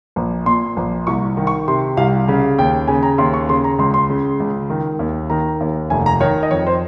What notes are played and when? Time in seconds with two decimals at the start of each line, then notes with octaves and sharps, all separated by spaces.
0.16 A#1
0.46 A#2 C6
0.77 A#1
1.07 C2 C#6
1.37 D#3
1.47 C#6
1.68 C3 C6
1.97 C2 F5
2.28 C#3 F5
2.58 D#2 G5
2.88 C#3 G#5
3.03 A#5
3.18 D#2 C6
3.34 C#6
3.49 C#3 C6
3.64 A#5
3.79 C#2 C6
3.94 C6
4.10 C#3
4.40 C#2
4.70 D#3
4.99 D#2
5.30 D#3 A#5
5.61 D#2
5.90 F1 G#5
6.06 A#5
6.20 D#3 C#5
6.43 D#5
6.51 F2 C#5
6.67 C5